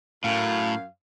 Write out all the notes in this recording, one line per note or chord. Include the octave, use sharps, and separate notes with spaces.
F#2 A2 F5